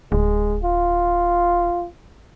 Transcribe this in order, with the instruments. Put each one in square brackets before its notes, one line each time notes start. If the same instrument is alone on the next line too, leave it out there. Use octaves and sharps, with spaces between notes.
[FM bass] D1 [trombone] G#3
[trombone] F4